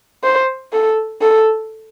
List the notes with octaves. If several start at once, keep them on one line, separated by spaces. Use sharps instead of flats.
C5
A4
A4